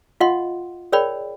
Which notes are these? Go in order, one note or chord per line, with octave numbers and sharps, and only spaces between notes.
F4 D#5 F5 F#5 C6
G#4 A#4 C#5 D5 G5 B5